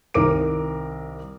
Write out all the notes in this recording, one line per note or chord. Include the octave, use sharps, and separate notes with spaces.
C2 D#3 A#4 D6 D7